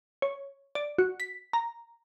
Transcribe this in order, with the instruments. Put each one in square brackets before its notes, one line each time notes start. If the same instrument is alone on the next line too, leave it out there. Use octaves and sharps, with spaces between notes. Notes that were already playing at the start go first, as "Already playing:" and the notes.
[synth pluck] C#5
D5
F#4
B6
A#5